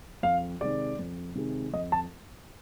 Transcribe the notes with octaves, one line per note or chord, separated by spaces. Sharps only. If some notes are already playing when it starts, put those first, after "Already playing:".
F2 F5
C3 D#3 G#3 D5
F2
C3 D#3 G#3
F2 D#5
A5